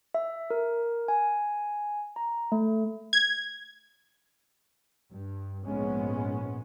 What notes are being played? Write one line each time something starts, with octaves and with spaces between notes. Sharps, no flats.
E5
A#4
G#5
A#5
A3
G#6
G2
A#1 G#2 G#3 B3 C#4